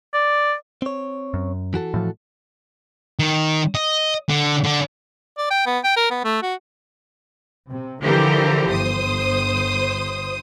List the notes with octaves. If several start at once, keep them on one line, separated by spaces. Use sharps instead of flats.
D5
C4 C#5
F#2
E3 F#4 A4
A2 F3
D#3
D#5
D3
D3
D5
G5
B3
G5
A#4
B3
A3
F#4
C3
D3 E3 F3 G4 A#4 C5
G1 C5 D#6